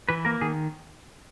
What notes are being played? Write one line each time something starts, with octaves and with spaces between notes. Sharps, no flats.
E3 B4
A#3 A#4
D#3 G#4